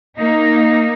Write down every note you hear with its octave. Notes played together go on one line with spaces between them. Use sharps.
A#3 D#4